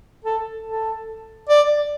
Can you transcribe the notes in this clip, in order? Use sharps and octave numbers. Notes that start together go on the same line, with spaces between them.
A4
A4
D5